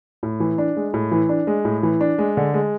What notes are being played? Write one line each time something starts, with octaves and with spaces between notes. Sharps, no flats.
A2
E3
D4
G#3
A2
E3
D4
G#3
A2
E3
D4
G#3
D3
G#3